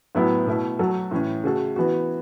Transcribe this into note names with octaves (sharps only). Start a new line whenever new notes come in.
A2 F#3 B3 E4 A4
B2 A3 E4
F#3 A3 F#4 A4
A2 E3 C#4
C#3 A3 F#4 A4
E3 B3 F#4